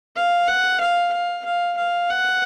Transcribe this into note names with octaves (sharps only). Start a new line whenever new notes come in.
F5
F#5
F5
F5
F5
F5
F#5